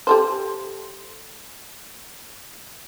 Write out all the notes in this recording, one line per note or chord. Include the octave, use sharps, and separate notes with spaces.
G4 A4 C5